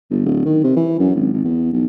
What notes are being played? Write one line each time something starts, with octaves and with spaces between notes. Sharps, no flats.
G1
D1
D#3
C3
E3
F#2
G#1
G#1
E2
B1